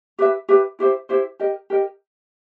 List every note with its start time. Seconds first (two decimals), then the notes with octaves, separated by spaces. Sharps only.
0.19 G4 B4 E5
0.49 G4 B4 E5
0.79 E4 G4 C5 E5
1.09 E4 G4 C5 E5
1.39 G4 A#4 D#5
1.70 G4 A#4 D#5